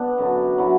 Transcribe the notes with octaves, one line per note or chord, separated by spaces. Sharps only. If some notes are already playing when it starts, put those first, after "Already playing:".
Already playing: B3 D4
F#2 D3 F#3
D3 F#3 E4